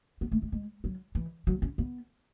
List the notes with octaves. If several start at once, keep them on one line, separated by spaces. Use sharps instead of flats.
B3
A3
G#3
G#3
F#3
E3
F#3
C#4
B3